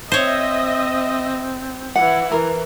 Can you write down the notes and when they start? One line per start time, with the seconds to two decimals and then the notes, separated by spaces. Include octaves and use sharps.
0.12 C4 C5 C#5 D#5 E5
1.96 E3 E4 F#5
2.32 E3 A#4